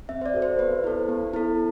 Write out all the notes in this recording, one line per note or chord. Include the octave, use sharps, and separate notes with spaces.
C4 E5
C5
D5
F#4 A4
C5
B3 B4
E4 A4 C5
B3
E4 A4